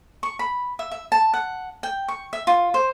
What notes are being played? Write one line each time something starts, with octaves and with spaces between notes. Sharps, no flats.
C#6
B5
E5
E5
A5
F#5
G5
C#6
E5
F4
C5